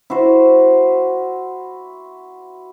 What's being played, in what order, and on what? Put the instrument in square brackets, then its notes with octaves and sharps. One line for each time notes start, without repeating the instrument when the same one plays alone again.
[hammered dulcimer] E4 F#4 C5